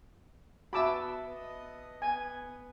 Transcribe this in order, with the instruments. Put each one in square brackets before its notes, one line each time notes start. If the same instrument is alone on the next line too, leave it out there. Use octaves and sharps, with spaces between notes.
[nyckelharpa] B3 [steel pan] F#4 D6 E6 [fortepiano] E5 A5 B5
[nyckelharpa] B3 D#5
[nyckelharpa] B3 [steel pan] G#5